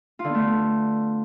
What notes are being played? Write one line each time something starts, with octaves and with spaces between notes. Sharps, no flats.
F4
D3
B3
A3